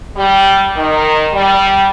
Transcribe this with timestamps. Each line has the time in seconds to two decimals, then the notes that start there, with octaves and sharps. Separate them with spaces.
0.17 G3
0.76 D#3
1.34 G3